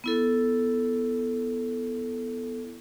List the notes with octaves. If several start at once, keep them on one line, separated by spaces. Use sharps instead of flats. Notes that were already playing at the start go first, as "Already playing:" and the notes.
B3 E4 A4